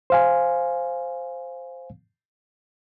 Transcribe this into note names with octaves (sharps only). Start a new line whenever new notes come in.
C5 F5 G#5